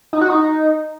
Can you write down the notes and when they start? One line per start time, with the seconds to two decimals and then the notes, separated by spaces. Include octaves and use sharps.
0.13 D#4
0.21 F#4
0.30 D#4